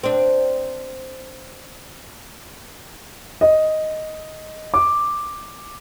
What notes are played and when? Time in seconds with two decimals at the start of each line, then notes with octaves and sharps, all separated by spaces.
0.03 C4 D4
3.41 D#5
4.74 D6